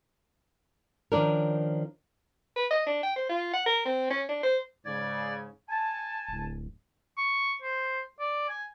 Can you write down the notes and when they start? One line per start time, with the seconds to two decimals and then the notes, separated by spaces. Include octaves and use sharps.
1.12 D#3 F3 C#4 D4 A#4
2.56 B4
2.71 D#5
2.86 D4
3.03 G5
3.16 C5
3.29 F4
3.53 F#5
3.66 A#4
3.85 C4
4.10 C#4
4.29 D4
4.43 C5
4.85 G#2 C#3 D5 G#6
5.70 G#5 A5
6.29 D1
7.18 C#6
7.62 C5
8.20 D5
8.49 G#5